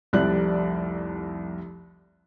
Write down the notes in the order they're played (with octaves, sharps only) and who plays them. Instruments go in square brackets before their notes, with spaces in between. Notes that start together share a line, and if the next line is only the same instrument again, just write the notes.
[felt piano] F1 C2 F2 G4 D5 F#6